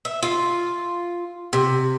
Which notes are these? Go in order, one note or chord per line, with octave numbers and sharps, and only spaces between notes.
E5
F4
C3